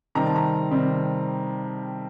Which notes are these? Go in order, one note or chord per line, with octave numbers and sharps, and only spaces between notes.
C3 D#3 G3 C4 A#5
A5
A#5
C3 D#3 G3 C4